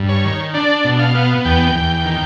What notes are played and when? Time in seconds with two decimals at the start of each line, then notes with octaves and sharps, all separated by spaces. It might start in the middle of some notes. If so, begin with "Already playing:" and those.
Already playing: G2
0.09 C#5
0.25 D#3
0.54 D4 D5
0.85 B2
0.99 F5
1.15 B3
1.45 E2 G5
1.76 E2
2.05 D#3